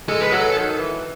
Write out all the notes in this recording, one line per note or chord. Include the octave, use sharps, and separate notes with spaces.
G#3 A4
B4
F#3 A4
D#3
E3